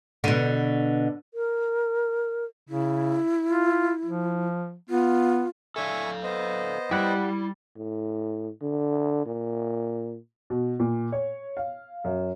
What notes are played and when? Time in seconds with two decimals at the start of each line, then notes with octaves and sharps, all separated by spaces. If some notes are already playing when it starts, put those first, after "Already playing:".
0.24 B2 D3
1.34 A#4
2.69 C#3 E4
3.48 F4
4.05 F3
4.90 B3 F4
5.76 A4 D5 E5 F5 G#5 C#6
6.23 B3 C5 D#5
6.91 G3 E4 G4 F#5
7.76 A2
8.62 D3
9.25 A#2
10.50 B2
10.80 A#2
11.12 C#5
11.57 F5
12.04 F#2